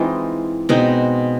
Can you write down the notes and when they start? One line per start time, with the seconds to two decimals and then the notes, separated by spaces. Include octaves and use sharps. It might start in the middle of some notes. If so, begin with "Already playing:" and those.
Already playing: E3 G#3 C4 D#4 F4
0.69 B2 G#3 C4 D#4